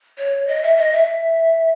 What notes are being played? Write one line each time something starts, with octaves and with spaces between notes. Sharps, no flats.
C#5
D#5
E5
D#5
E5